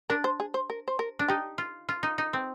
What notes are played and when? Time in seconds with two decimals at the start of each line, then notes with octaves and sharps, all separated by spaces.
0.10 D4 A#4
0.24 C5
0.40 G#4
0.54 C5
0.70 A#4
0.88 C5
0.99 A#4
1.19 D4
1.28 D#4 G4
1.58 F4
1.89 F4
2.03 D#4
2.18 D#4
2.33 C4